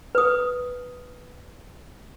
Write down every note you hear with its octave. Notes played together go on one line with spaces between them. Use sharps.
B4 D#6